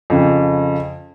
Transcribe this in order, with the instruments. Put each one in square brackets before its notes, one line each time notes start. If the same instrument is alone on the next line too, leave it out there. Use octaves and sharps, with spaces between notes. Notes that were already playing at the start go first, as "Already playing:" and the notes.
[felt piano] F2 C#3